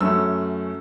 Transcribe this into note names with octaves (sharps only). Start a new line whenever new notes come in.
F#2 F#3 A3 C#4 E6